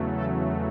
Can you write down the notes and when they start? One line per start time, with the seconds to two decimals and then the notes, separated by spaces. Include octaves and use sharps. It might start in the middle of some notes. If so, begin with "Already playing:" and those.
Already playing: E2 C#3 F#3 A3
0.09 A4